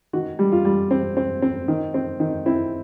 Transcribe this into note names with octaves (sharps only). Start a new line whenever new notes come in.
D#3 F#4
G3
F4
G3
C4
C4
C4
D#3
C4
D#3
C4 E4